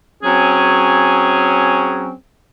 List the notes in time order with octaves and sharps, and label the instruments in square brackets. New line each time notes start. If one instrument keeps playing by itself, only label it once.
[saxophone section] F#3 C4 C#4 G#4